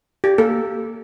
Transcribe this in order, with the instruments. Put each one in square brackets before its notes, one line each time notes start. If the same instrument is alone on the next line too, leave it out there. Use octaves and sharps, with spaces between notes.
[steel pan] G4
A#3 A4